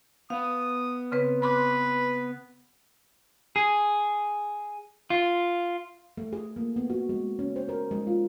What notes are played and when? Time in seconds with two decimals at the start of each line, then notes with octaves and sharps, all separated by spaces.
0.30 B3 F5 D#6
1.12 C#3 C4 B4
1.42 B4 B5 C6 D6
3.56 G#4
5.10 F4
6.17 A3
6.33 G#4
6.56 A#3
6.76 B3
6.90 F#4
7.09 G#3
7.39 C#4
7.56 C5
7.69 A#4
7.91 G#3
8.07 F4